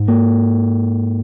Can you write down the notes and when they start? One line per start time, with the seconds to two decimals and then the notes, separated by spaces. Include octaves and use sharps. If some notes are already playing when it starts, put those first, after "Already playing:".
Already playing: G#2
0.08 A#3